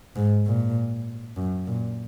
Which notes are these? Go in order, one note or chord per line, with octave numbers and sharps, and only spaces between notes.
G#2
A#2
F#2
A#2